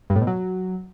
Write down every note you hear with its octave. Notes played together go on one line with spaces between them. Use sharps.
G2
A2
B2
F#3